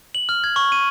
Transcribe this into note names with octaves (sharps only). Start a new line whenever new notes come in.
F#7
F6
G#6
C#6
D#7